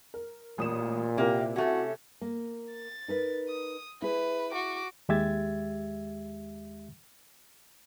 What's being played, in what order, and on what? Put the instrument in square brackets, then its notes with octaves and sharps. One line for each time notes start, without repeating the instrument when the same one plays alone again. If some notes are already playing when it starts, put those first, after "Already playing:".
[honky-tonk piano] A#4
[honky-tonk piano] A1 D#6 E7 [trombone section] A#2
[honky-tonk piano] C3 E4 [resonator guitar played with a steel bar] A#3 [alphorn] G4
[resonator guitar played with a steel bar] A3 C#4 [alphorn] F#4
[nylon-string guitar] A#3
[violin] A6
[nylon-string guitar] D#4 A#4 B4
[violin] D#6
[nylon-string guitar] E4 G#4 [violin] B4
[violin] F#4 D6
[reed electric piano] D#2 G#3 G4 E5 G#6 A6